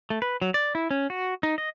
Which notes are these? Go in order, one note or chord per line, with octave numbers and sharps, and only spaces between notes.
A3
B4
F#3
D5
E4
C#4
F#4
D#4
D#5